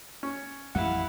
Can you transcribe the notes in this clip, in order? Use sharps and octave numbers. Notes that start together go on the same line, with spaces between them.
C#4
A1 F2 G3 E4 F5 F#5